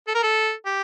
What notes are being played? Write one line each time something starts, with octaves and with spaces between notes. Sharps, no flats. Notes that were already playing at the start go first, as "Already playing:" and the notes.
A4
A#4
A4
G4